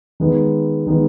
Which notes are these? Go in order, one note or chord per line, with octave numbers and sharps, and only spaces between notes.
D#3 G#3 B3
D#3 G#3 B3